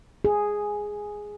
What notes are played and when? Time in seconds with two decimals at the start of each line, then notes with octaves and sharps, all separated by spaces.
0.25 G#4